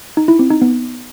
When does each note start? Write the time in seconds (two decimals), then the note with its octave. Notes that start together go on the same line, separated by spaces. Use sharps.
0.17 D#4
0.28 E4
0.39 C4
0.50 D#4
0.62 B3